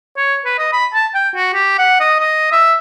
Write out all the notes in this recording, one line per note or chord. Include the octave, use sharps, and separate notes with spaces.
C#5
B4
D#5
B5
A5
G5
F#4
G4
F#5
D#5
D#5
E5